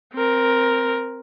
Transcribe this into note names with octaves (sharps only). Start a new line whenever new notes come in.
C4 A#4